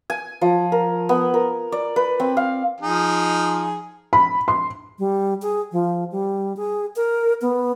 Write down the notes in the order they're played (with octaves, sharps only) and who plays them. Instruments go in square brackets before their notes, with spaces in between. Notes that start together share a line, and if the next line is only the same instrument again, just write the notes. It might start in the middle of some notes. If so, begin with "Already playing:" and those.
[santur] G#5
F3
A#4
B3
A#4
D5
B4
C4
F5
[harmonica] F3 D#4 G#4
[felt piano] B5
C6
[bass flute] G3
G#4
F3
G3
G#4
A#4
B3